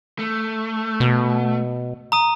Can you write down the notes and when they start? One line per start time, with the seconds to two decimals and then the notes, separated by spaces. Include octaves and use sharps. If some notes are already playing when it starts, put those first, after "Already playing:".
0.19 A3
1.00 B2
2.12 A#5 D#6 D#7